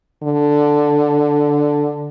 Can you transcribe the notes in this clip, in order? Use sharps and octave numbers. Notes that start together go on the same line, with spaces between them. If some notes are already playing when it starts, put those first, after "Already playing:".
D3